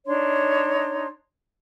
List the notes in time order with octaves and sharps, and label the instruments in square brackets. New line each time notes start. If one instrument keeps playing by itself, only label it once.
[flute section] D4 D#4 C#5 C6